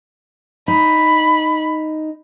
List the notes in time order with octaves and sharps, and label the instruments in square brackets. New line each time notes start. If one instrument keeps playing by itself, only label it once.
[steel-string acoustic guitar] D#4 [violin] B5